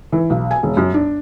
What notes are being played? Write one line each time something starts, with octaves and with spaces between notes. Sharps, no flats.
E3
B1
G#5
E1
F#2
D4